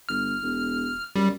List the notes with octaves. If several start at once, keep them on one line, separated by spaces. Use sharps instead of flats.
G1 F6
E1
F#2 G3